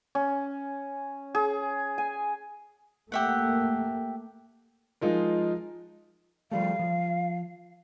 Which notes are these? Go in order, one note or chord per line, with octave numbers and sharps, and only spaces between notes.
C#4
G#4
G#5
A3 A#3 G4 E5 F#5
F3 G#3 D#4 F4 A#4
F3 G3 A3 F5
F3